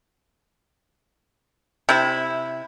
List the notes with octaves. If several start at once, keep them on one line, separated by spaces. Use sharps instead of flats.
C3 E4